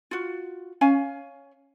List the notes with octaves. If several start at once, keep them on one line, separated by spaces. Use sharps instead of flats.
F4 F#4
C#4 F5 G#5